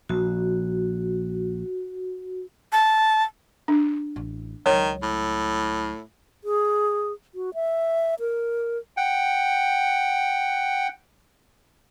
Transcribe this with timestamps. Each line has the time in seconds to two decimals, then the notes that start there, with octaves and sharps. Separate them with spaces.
0.09 A#1 F#4
2.72 A5
3.68 D4
4.16 A1
4.66 C#2 D#3 F#3 C#5
5.02 A2
6.44 G#4
7.34 F#4
7.54 E5
8.20 A#4
8.97 F#5 G5